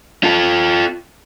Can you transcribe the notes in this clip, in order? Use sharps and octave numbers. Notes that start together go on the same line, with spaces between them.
F4 A4